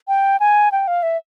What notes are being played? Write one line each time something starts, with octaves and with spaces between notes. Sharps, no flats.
G5
G#5
G5
F5
E5